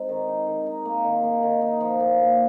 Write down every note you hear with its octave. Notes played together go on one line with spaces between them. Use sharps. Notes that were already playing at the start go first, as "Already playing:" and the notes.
Already playing: G#3 C4 D#4
D#3
D#4
D#3
D#4
A#3
D#3
A#3
D#3
D#4
F3
A#2
A#2